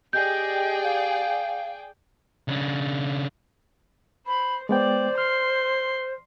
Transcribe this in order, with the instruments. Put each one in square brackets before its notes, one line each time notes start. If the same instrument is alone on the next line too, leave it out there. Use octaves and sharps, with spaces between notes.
[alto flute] G4 [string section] G#4 D5 G5 [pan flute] D#5 [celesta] G6
[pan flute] F5
[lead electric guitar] C#3 D4
[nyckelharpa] C5 [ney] B5
[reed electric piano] G#3 B3 G5 [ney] C5 [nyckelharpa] D5
[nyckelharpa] C6 [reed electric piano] F6